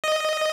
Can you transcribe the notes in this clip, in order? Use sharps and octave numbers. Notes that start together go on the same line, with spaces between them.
D#5